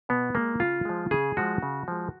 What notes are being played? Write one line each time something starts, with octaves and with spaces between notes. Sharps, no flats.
B2 B3
G#3 A#3
C#3 F4
F3 G#3
C#3 G#4
F3 G#3 F#4
C#3
F3 G#3